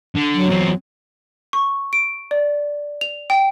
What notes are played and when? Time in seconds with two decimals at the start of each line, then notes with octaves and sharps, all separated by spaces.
0.15 D3
0.34 F#3
0.49 E2 C4
1.53 C#6
1.93 D7
2.31 D5
3.01 F7
3.30 G5